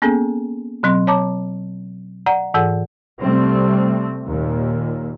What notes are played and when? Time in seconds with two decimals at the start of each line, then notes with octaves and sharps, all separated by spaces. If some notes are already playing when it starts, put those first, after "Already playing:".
0.02 A#3 B3 C#4 G#4 A4
0.83 B2 F#3 C4 C6
1.07 C#5 A5 A#5 D6
2.26 D5 F#5 A#5
2.54 G#2 E3 G#4 A4 F#5
3.20 C3 G3 A3 C4
4.26 D#2 A#2